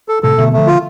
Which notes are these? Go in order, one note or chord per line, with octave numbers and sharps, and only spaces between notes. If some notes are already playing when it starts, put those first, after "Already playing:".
A4
A2 C3 A4
B2 D3 A3
D3 F3 A3
F4